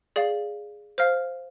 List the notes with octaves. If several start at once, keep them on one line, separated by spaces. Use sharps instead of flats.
G#4 D5 F5
C5 F5 F6